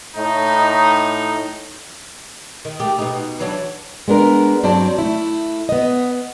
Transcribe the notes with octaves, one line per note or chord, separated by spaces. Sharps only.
A2 D#4
D#3
A3 G4
B2 D#4
E3 F#3 D4
G#3 B3 D4 A#4
G2 F#3 C4 D5 A5
A3 E4
B3 D#5